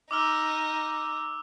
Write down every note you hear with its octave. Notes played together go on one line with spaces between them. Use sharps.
D#4 D6 E6 F6